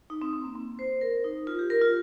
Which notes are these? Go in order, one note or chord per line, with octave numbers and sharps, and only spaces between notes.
D#4
C4
C4
A#3
C4
C5
A#4
D#4
F4
G4
A#4
F4